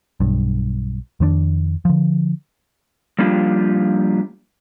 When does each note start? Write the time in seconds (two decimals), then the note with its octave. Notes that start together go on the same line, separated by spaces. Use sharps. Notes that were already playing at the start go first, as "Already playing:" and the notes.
0.20 B1 G2
1.20 F2 D#3 B3 D4
1.85 D3 F3
3.19 F3 G3 A#3 D4 F4 G4